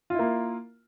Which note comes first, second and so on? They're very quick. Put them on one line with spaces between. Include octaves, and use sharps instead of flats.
F4 E4 A#3